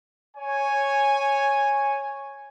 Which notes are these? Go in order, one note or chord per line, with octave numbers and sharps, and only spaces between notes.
C#5 G#5